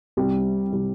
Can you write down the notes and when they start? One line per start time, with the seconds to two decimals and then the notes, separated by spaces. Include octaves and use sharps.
0.17 C2 C3 G3
0.72 C3 G3